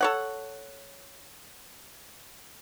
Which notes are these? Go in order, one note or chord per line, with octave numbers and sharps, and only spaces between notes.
A4 C#5 F#5